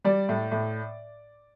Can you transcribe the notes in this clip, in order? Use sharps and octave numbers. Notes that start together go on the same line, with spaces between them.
G3 D5
A2
A2